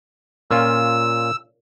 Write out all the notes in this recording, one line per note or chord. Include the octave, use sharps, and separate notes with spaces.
A#2 C#4 F4 E6